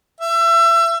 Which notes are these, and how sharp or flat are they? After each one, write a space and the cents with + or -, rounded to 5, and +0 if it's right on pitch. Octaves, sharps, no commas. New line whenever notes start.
E5 +30